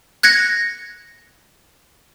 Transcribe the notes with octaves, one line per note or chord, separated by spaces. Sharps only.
F#6 G#6 A#6 C#7